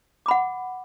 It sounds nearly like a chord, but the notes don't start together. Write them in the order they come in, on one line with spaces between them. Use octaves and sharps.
D6 B5 F#5